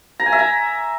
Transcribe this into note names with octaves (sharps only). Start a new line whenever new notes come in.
A#5
G#5
E5
A#5